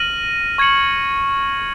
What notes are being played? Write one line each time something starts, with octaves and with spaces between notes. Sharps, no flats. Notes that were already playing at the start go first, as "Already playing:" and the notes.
Already playing: F6 A#6 D#7 F#7
C#6 G#6 C#7 F#7